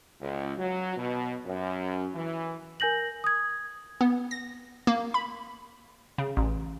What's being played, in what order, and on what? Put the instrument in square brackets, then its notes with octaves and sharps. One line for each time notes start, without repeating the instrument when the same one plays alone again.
[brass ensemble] C#2
F#3
B2
F#2
E3
[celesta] A#4 G#5 G6 A#6 F#7
D#6 G#6
[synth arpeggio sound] B3
A#6
A#3
B5
C#3
A1